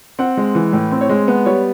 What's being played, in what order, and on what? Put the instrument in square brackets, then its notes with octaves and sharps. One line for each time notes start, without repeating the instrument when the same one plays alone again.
[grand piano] C4 F#5
G#3
E3
A2
C4
C#5
G#3
B3
G3 C#5